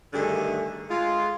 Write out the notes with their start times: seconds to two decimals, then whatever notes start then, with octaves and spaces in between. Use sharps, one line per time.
0.14 G2 D3 D#3 A3 G#4
0.90 G#3 F4